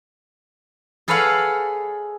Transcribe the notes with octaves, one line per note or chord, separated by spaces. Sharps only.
G#4 A4 B4 C#5 F5 F#5